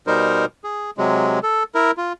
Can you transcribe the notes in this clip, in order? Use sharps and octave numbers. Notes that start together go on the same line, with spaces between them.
B2 G3 D#4 A#4 C5
G#4
C3 F#3 G#3
A4
E4 A#4
F4